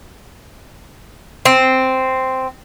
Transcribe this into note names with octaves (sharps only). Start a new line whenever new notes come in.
C4